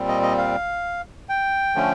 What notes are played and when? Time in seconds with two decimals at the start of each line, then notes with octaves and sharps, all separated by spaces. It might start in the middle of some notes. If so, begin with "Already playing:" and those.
Already playing: A#2 G3 C4
0.08 D#5
0.23 D#5
0.38 F5
1.29 G5
1.75 D3 F3 A3 C#4